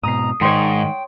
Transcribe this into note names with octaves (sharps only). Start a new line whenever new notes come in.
G#2 B2 A#5 D#6 C7
G#2 D#3 C#5 G5 C6